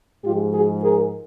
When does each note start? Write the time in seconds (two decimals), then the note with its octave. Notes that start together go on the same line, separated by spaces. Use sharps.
0.25 G#2 F3 G#3 F4 G4
0.54 F#4 G#4
0.83 G#4 A#4